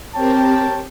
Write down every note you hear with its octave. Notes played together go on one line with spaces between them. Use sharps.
C4 G4 A#4 C#5 G5 A5